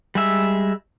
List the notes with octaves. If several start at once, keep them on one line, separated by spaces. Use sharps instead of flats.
G3 G#3 E5